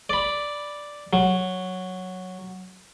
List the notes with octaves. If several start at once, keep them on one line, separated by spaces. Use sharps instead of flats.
D5 B5
F#3